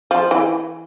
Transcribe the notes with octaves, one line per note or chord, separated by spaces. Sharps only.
F3
E3